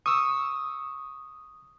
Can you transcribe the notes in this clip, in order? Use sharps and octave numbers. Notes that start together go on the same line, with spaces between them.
C#6 D#6 E6